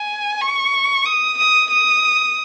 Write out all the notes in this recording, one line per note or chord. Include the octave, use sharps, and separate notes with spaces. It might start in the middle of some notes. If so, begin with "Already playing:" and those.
Already playing: G#5
C#6
D#6
D#6
D#6